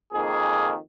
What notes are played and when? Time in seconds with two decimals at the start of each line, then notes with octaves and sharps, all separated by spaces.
0.13 F2 D#3 A#3 G#4